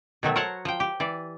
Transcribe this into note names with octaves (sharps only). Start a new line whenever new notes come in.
B2 D#3 F#3 A3
A#4 C5 C#5 F#5 A5 A#5
F3 G5
G4
E3 D5